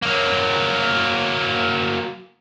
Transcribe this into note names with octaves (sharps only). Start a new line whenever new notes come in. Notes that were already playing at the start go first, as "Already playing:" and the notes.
F#3 A#3